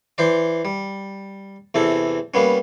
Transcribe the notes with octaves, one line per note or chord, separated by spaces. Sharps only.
E3 C5 D5
G3
E2 C3 E3 A4
G3 A#3 B3 C#4